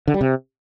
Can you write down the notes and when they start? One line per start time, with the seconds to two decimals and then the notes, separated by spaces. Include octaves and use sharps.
0.08 D3
0.14 G3
0.21 C3